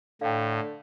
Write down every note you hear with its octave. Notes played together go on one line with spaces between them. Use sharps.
A2 D3 F5 G5